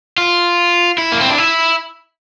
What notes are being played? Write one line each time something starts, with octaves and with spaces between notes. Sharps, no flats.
F4
E4
A#3
C4
D4
E4